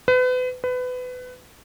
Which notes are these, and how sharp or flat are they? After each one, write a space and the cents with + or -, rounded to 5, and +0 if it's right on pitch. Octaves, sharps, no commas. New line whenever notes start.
B4 +35
B4 +25